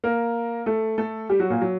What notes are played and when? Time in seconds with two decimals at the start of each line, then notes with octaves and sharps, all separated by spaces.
0.04 A#3 A#4
0.66 A3 A4
0.98 A3 A4
1.29 G3 G4
1.40 F#3 F#4
1.50 A#2 A#3
1.61 F#3